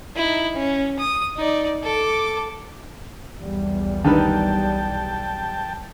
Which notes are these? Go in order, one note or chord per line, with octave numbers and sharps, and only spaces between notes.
D#4 E4
C#4
D#6
D#4 D5
A4 D6
B1 E2 G3
D3 D#3 B4 G5 A5